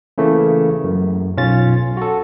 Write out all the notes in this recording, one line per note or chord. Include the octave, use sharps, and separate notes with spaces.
C#3 E3 A3 A#3
F#2
B1 C#4 F4 A6
F#4 A4